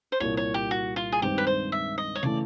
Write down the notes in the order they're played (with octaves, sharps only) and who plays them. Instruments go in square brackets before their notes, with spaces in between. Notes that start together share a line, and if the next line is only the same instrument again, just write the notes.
[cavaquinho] C5
[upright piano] C2 A#2 G3 A#3 [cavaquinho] C#5
[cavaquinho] C#5
G4
F#4
F4
G#4
[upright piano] G2 D#3 G#3 C4 D#4 [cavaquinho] G4
[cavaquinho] B4
C5
E5
D#5
C#5
[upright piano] C#3 E3 A3 [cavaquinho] D5